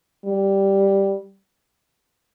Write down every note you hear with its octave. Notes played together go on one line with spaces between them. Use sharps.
G3